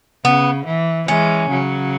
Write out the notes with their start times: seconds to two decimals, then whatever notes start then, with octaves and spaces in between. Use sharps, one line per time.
0.25 C#3 B3
0.66 E3
1.07 E3 G#3 C#4
1.50 C#3 F#3